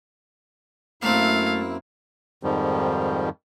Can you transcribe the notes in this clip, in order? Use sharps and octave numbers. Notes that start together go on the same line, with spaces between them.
F#2 A3 A#3 C4 E4 F5
F2 G#2 D#3 F3 G3